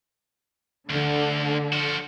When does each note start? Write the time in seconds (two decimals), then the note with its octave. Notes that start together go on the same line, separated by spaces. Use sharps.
0.90 D2 D3
1.73 F3 F#4